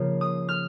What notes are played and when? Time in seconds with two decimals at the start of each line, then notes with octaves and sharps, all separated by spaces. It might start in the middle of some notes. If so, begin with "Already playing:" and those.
Already playing: C#3 F3 A#3 F4
0.21 D#6
0.49 F6